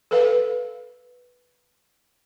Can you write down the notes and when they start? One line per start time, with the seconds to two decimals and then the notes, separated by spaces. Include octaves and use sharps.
0.11 A4 B4 F5